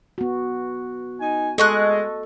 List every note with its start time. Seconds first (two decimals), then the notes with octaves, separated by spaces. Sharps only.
0.18 B3 F#4
1.20 D#4 G#5
1.58 G#3 A4 D#5 C#6 F#6